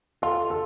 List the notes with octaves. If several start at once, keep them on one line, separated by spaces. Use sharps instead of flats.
F4 A4
A4